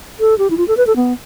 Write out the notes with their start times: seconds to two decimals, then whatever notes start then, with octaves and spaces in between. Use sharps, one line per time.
0.20 A4
0.38 G4
0.50 E4
0.57 F4
0.68 A4
0.77 B4
0.87 A4
0.96 B3